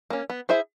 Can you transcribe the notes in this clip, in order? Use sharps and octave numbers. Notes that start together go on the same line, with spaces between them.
A#3 C#4
B3
E4 G#4 C5 E5